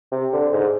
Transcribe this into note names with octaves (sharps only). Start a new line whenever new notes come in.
C3
D3
G#2